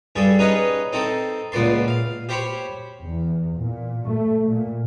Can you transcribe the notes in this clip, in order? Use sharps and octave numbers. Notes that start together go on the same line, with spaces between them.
G2 G3 G#4 A4
C#4 D#4 G#4 B4 C#5 D#5
C4 D#4 A4
C#2 A#2 B3 D5 C6
F5
G4 C5 C#5 B5
E2
A#2
A3
A#2